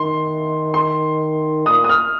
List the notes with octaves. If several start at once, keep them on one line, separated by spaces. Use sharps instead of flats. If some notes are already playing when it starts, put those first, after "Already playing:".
Already playing: D#3 C6
C6
A#2 D#6
D#6
F6